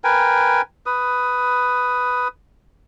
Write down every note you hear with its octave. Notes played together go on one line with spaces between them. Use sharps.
A#4 B4 G5 G#5
B4 D#6